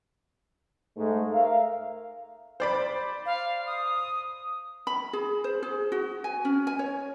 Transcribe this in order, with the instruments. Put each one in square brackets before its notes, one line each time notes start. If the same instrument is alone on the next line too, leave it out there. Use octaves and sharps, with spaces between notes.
[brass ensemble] G#2 A3
A#4 E5 F5
[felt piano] C5 D5 B5
[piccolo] F5
D#6
[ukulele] B5
G#4
C5
G#4
F#4
G#5
C#4
G#5
C#5